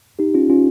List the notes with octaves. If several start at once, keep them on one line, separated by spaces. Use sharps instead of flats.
D#4 G4
C#4 F4
C#4 F4